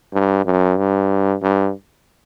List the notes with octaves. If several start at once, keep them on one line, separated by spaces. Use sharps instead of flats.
G2
F#2
G2
G2